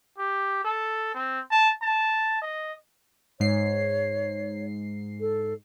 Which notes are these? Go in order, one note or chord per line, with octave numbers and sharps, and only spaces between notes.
G4
A4
C4
A5
A5
D#5
G#2 C#5 C7
A4